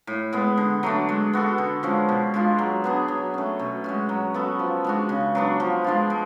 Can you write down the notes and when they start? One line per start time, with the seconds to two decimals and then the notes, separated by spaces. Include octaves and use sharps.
0.07 A2
0.33 G#3 B3
0.57 D3
0.83 F#3 A3 D4
1.09 G#3
1.33 B3 F#4 A4
1.58 D3
1.83 F3 G#3 C#4
2.09 B2
2.34 G#3 D4 F4
2.58 F#3
2.84 B3 D4 G#4
3.08 F#3
3.34 A3 C#4
3.59 B2
3.84 G#3 C#4 F#4
4.09 F#3
4.34 B3 F#4 A4
4.59 F3
4.84 G#3 D4 F#4
5.09 C#3
5.35 F#3 B3 D4
5.60 F3
5.84 G#3 D4 F4
6.10 G#3